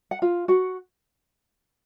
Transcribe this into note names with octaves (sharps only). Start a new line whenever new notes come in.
F#5
F4 F5
F#4 F#5